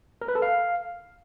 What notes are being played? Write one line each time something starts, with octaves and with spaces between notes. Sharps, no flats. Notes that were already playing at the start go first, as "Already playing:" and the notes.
A#4
B4
A4
F5